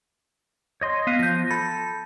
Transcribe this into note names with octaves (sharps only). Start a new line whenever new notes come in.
C#5 D#5 C6
B3 F5 D#7
F3 G6 A#6
A4 B5